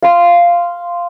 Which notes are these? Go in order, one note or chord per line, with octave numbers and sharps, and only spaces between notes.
F5 C6